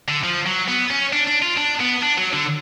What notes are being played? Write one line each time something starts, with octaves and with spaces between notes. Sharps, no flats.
D3
F3
F#3
B3
C#4
D4
D4
F4
D4
B3
D4
F#3
D3